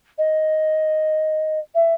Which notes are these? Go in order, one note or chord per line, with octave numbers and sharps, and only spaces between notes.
D#5
E5